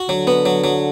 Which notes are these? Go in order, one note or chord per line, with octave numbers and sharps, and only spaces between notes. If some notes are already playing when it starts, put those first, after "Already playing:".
Already playing: F#4
D3 F#3
B3
F#3
F#3